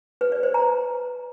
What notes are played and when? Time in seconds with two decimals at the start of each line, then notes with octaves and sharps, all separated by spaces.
0.21 B4
0.32 D5
0.43 C5
0.54 A#5